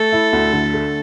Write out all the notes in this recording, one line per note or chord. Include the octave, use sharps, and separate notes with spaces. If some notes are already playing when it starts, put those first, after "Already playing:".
Already playing: A3 A4
E4
D2
D3
A3